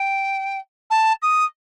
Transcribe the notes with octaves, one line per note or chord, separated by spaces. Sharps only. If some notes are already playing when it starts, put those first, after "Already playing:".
Already playing: G5
A5
D#6